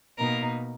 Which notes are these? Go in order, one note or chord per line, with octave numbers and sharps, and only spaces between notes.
B2 A#3 D#4 A#4